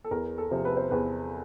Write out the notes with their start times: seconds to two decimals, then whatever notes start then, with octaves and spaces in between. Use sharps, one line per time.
0.04 A4
0.11 E2 A#4
0.38 A4
0.51 C3 F3
0.65 B4
0.77 C5
0.91 E2 B4